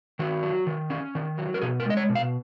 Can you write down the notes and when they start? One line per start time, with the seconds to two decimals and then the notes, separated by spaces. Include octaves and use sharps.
0.19 D#3 F#4
0.43 F#3
0.67 D#3
0.90 C#4
1.15 D#3
1.38 F#3
1.54 A#4
1.61 B2 G#4
1.80 A#4
1.86 G#3 D#5
1.97 C#5
2.09 B2
2.15 F5